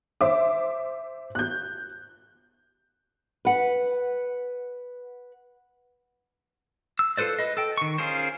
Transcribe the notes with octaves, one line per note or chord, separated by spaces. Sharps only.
C5 E5 D6
F#6 G6
B4 F#5
E6
F4 A4 B4 C5 D5
B4 D#5
A4 G5
D#3 C#6
C#4 F4 G#4 A#4 C5